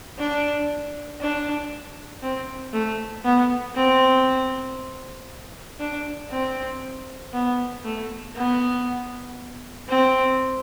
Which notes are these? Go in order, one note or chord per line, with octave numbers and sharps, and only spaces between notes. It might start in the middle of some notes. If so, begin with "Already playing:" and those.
D4
D4
C4
A3
B3
C4
D4
C4
B3
A3
B3
C4